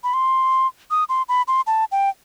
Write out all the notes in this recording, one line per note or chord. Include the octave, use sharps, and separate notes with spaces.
B5
C6
D#6
C6
B5
C6
A5
G5